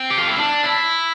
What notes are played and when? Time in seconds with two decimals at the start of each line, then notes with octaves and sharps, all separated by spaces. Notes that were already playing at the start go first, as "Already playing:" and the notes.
Already playing: C4
0.10 G4
0.19 F4
0.29 E4
0.37 D4
0.63 E4